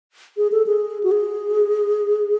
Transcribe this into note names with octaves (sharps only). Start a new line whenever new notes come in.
G#4
A4
G#4
F#4
G#4